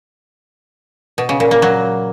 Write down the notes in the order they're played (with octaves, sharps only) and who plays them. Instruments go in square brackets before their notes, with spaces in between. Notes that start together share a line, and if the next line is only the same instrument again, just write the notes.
[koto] B2
C#3
A#2
A#3
F#3